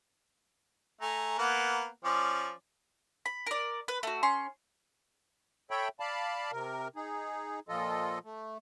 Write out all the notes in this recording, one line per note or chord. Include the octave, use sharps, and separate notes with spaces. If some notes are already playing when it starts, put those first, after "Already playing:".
A3 G#5 A#5
A#3 B3 F#5
F3 C#4 D5
B5
A#4 D5
B4
A3 F#4
C#4 C6 C#6
A4 C#5 E5 G5 B5
D5 F5 A5 B5
C3 A#4
D#4 G#4
A#2 F3 F4 A4 D#5
A3